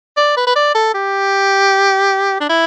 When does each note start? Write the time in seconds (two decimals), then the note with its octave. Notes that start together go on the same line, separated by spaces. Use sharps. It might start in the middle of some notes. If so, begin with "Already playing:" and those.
0.17 D5
0.37 B4
0.47 B4
0.56 D5
0.74 A4
0.94 G4
2.40 D4
2.49 E4